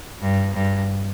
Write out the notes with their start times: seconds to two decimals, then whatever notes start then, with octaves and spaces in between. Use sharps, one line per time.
0.22 G2
0.54 G2